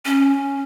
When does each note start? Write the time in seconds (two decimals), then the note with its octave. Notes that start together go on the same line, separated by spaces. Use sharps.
0.05 C#4